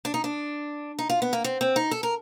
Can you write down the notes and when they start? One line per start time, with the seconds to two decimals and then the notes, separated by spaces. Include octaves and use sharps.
0.05 D4
0.14 D#4
0.24 D4
0.99 D#4
1.09 F4
1.22 B3
1.33 A#3
1.44 C4
1.61 C4
1.76 D#4
1.91 A4
2.03 A#4